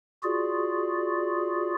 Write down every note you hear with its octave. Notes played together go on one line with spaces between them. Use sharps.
F4 F#4 G#4 D5